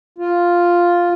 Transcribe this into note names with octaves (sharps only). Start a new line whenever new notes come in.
F4